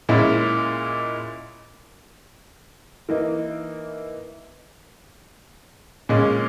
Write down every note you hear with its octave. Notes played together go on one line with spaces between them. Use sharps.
A#2 G#3 C#4 E4
E3 A#3 D#4
A#2 G#3 C#4